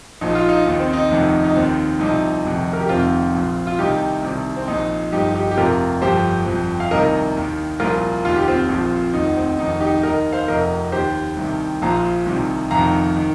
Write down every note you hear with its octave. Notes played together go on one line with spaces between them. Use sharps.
A#1 A#2 F3 D#4
F4
D#4
D#2 D#3 D#4
C4
D#4
F1 F2 C3 D#3
D#4
D#2 D#3 C4
C2 C3 F3 D#4
F1 F2 C3 D#3
A#4
G4
F1 F2 C3 D#3 C4 F4
A#1 A#2 F3
F4
C2 C3 D#3 D#4 G4
C2 C3 D#3
C4
A#1 A#2 F3 D#4
G1 G2 F3 D#4 G4
D#4 G4
G4
F1 F2 C3 F4 A#4
G1 F2 F3 G4 C5
G1 F2 F3
F5
C2 C3 D#3 A#4 D#5
D#2 D#3
C2 A#2 F3 F4 A#4
F1 D#2 D#3 F4
G4
C4 F4
A#1 A#2 F3
F1 D#2 D#3 D#4
C4
F1 F2 D#3 D#4
D#4 G4
D#2 D#3 A#4 D#5
C5 F5
F1 F2 C3 A#4 D#5
D#2 D#3 G4 C5
C2 C3 D#3
A#1 A#2 F3 F5 A#5
C2 C3 D#3
F1 F2 C3 D#3 F5 A#5
D#3